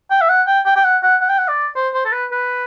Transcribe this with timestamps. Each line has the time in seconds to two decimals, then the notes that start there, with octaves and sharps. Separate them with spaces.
0.11 G5
0.21 E5
0.29 F#5
0.47 G5
0.66 G5
0.76 G5
0.84 F#5
1.03 F#5
1.21 F#5
1.29 G5
1.38 F#5
1.48 D5
1.76 C5
1.94 C5
2.05 A4
2.12 B4
2.31 B4